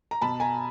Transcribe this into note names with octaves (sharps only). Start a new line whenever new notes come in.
A#5
B2 A5 B5
G#5 A#5